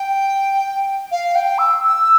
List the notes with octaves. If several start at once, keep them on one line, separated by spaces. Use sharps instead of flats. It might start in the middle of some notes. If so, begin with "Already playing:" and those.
Already playing: G5
F5
G5
E6
E6